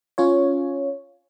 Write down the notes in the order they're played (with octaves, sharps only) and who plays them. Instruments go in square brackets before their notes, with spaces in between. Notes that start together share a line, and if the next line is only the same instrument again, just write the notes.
[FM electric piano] C#4 F4 C#5